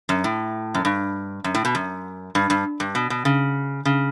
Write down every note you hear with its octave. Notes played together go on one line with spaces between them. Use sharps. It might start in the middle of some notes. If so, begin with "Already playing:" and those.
F#2
A2
F#2
G2
F#2
A2
B2
F#2
G2
G2
G2
B2
B2
C#3
C#3